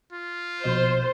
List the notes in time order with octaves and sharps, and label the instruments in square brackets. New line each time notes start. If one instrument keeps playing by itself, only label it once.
[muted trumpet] F4
[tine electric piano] A#1 B2 D#5 [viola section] C5